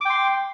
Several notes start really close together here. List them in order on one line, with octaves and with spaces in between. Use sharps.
D6 G5 C6